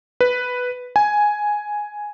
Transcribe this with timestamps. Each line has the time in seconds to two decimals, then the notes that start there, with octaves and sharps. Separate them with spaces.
0.21 B4
0.96 G#5